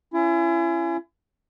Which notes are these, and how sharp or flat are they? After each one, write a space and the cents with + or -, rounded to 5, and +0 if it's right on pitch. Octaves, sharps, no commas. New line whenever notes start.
C#4 +0 E4 +40